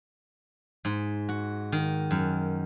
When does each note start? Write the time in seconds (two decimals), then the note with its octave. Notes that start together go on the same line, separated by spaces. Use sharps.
0.85 G#2
1.29 F#4
1.72 D#3
2.11 F#2